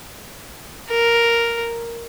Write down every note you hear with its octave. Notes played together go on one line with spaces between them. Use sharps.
A#4